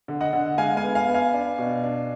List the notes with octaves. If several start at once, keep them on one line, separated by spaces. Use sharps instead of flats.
D3
D#5 F#5
D3
G#3 F5 G#5
F5 G#5
B3
F5 G#5
B3
F5 G#5
D4
B2
D4